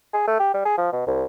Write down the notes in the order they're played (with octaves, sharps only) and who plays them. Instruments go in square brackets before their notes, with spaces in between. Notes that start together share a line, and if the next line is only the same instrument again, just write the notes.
[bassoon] G#4
A3
G4
G3
G#4
F3
B2
C2